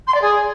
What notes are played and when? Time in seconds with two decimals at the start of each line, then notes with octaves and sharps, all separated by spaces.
0.08 C6
0.15 D5
0.22 G#4